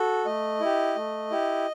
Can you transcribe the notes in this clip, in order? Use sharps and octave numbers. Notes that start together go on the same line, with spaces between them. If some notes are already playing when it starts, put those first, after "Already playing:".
Already playing: F#4 A4
A3 D#5
E4 G4
A3
E4 G4